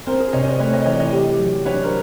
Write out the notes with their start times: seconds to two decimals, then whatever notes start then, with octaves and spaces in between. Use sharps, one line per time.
0.07 C4 A#4 C5
0.20 G#4 A#4
0.33 C3 C#5 D#5
0.47 C5 D5
0.59 A3 B4 C#5
0.73 C#5 D#5
0.86 E3 C#5 D#5
0.93 D5
1.00 C#5 D#5
1.13 G4
1.39 F#3
1.65 D4 B4 C#5
1.83 A#4 C5